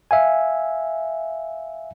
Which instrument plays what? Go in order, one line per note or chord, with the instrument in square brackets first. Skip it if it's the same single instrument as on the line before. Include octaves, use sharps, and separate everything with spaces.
[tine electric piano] E5 F5 G#5